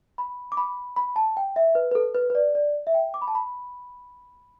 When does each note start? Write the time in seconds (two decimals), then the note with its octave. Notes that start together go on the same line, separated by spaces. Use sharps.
0.18 B5
0.52 D6
0.57 B5
0.96 B5
1.16 A5
1.37 G5
1.56 E5
1.75 B4
1.92 B4
1.95 A4
2.15 B4
2.30 B4
2.35 D5
2.55 D5
2.87 E5
2.94 G5
3.14 D6
3.22 B5
3.28 A5
3.35 B5